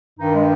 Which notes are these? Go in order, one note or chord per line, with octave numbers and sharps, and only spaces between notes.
G2 D#3 D#4
G#3